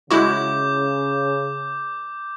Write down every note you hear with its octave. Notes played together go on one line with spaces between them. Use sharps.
C#3 G#3 E4 F#4 D6 G6